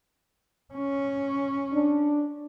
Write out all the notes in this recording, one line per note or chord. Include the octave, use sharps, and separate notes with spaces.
C#4
D4